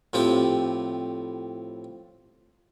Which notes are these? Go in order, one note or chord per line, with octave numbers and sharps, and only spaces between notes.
A2 F3 C4 G4